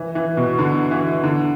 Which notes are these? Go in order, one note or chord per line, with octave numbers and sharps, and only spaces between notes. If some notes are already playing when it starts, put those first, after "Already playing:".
Already playing: E3
E3
B2
D3
E3
D3